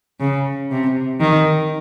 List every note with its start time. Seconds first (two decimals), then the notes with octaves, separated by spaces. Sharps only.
0.20 C#3
0.71 C3
1.20 D#3